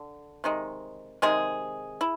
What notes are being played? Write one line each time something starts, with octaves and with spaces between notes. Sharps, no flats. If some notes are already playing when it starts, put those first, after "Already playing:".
Already playing: D3
C3 D#3 G#3
C3 D#3 G#3 G#4
E4